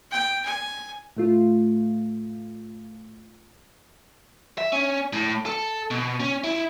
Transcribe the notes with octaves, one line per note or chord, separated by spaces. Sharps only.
G5
G#5
A2 A3 F4
E5
C#4
A2
A4
B2
C#4
E4